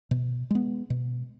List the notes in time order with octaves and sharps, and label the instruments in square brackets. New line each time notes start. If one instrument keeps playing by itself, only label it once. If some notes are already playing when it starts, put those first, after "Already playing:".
[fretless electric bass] B2
G#3 B3
B2